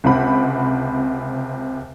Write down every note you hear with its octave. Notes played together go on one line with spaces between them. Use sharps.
C#2 C3 C4 F#5 B5